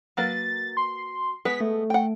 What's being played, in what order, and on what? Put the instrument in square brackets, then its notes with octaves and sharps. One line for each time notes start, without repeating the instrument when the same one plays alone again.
[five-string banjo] F#3 A#3 B4 [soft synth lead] A6
[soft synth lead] C6
[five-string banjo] G#3 B3 B4 [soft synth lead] B6
[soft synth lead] A3
[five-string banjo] F#5 G5